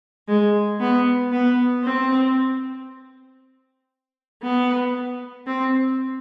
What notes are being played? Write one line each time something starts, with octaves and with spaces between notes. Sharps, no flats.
G#3
B3
B3
C4
B3
C4